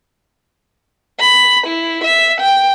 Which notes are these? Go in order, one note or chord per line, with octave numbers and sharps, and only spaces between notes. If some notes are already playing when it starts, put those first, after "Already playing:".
B5
E4
E5
G5